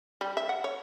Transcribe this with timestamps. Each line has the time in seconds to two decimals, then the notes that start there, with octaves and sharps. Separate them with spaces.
0.21 G3
0.37 E5
0.49 F#5
0.64 C#5